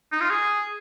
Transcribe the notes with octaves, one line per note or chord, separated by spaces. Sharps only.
D#4
F4
G#4